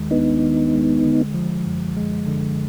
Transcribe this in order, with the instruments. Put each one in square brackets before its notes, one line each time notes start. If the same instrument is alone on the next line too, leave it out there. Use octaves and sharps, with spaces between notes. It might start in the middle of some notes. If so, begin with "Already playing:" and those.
Already playing: [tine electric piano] D#2 D#3 G#3
[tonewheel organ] B3 D#4 [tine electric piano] D4
[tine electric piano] D#3
G#3
D3
F3
F#2
G#3
D3